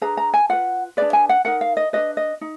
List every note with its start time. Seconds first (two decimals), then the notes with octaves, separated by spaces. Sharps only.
0.01 D4 G#4 B4 A#5
0.17 A#5
0.34 G#5
0.49 F4 B4 F#5
0.97 D4 G#4 B4 D5
1.13 G#5
1.29 F#5
1.45 D#4 A#4 F#5
1.61 F5
1.77 D#5
1.93 D4 F#4 B4 D#5
2.17 D#5
2.41 D#4